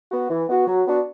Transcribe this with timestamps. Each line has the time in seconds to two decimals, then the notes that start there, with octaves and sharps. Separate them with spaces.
0.11 B3 F#4
0.30 E3
0.49 B3 F#4
0.67 F#3
0.86 B3 D4 F#4